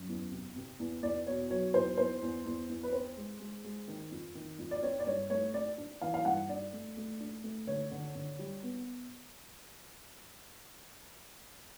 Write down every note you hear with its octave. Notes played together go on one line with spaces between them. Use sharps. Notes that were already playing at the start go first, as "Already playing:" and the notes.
Already playing: F#2
E2
C3
C3
E2
E2 D5
B2 C#5
F#3 C#5
E2 C5
E2 C5
E2
E2
E2
B4
C4 C5
G#3
G#3
G#3
D#3
F2
D#3
F2
D5
C4 C#5
D5
G2 C#5
A3 C#5
C4 D5
D4
E3 F5
F5
G2 F#5
D4 D5
A3
A3
D4
A3
D3 C#5
D3
D3
G3
B3